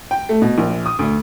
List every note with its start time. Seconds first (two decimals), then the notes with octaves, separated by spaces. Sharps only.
0.11 G5
0.29 A3
0.42 B2
0.58 A#1
0.86 D#6
0.99 D2